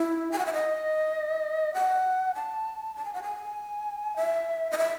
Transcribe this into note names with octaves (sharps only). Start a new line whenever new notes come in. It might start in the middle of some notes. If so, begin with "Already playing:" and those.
Already playing: E4
G#5
F#5
E5
D#5
F#5
A5
A5
G#5
F#5
G#5
E5
D#5
E5